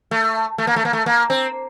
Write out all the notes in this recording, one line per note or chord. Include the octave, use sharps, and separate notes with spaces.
A3
A3
A#3
A3
A#3
A3
A#3
C4